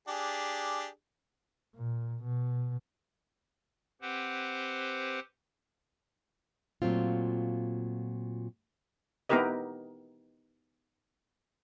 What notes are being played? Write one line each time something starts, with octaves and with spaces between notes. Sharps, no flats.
D4 G4 G#4
A#2
B2
C4 G4 B4 C5 F#5
A#2 F#3 A3 C4 F4
B3 D#4 E4 G4 A#4 D#5